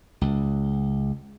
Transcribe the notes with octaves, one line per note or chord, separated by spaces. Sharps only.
C#2